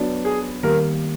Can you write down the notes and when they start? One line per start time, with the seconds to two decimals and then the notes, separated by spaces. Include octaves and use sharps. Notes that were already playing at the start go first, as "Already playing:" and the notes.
Already playing: F#3 B3 D4
0.25 G#4
0.63 D#3 G3 A#3 A#4